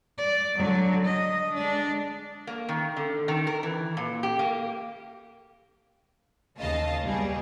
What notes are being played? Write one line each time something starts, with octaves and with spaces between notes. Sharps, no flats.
D5
D3 F#3
D#5
G#3 D4
A#3
D#3
D3
D#3
A#4
E3
A#2
G4
A#3
D#2 C#3 D#5 F5 A5
C#2 B2 G3 G#4